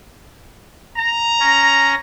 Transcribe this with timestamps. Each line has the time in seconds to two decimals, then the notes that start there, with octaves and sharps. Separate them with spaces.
0.98 A#5
1.40 C#4 A#6